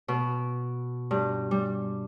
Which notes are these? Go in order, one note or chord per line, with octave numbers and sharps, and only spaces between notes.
B2
G2
G3